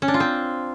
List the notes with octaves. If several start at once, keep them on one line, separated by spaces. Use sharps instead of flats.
C#4
D4
F4
C4